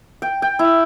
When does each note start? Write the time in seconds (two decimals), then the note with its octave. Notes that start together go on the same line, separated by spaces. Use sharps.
0.22 G5
0.42 G5
0.59 E4